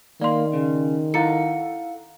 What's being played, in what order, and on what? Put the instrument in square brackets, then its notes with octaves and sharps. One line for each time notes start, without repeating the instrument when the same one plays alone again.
[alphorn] D#3 [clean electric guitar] A#3 [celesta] D5 C6
[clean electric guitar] C#3
[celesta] E4 A#5 C#7 [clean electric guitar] A4 F5 F#5